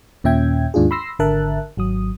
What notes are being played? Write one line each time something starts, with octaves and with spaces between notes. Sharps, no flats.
D#2 A#2 C#4 E5 G5 G#6
D#2 G#2 D4 F4 G#4
B5 C6 E6 A#6 C7
G#1 D3 A#4 E5 A5 F#6
G#1 F#3 D#6